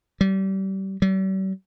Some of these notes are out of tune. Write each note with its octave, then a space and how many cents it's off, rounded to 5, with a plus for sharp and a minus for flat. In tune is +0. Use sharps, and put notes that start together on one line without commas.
G3 -30
G3 -45